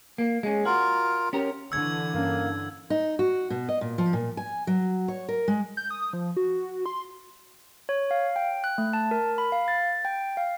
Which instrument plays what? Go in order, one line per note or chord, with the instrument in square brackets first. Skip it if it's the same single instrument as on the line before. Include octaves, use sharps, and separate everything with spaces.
[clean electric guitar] A#3
G#3 C#4
[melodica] F4 A#4 [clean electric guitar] F#4
[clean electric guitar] C#4 G4 A#4
[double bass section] D3 E3 [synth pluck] C#6 [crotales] E6 G#6
[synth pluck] G2 C#4 [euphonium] A#3
[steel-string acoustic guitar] D#4
F#4
B2
D#5
A#2
F3
A#2
G#5
F#3
C#5
A#4
G#3
[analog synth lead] G6
D#6
F3
F#4
C6
[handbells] C#5
F5
G5
F#6
A3
A5
A#4
B5
F5
A6
G5
F5